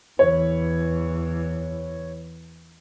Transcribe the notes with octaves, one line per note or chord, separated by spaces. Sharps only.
E2 E3 C#5